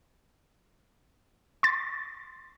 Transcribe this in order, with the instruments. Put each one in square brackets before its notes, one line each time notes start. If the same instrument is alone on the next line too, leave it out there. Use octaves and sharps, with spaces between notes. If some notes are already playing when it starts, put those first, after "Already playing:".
[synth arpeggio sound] C6 A6